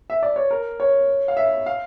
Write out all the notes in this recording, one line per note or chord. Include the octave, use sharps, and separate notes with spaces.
E5
D5
C#5
A#4
C#5
F5
E5
F5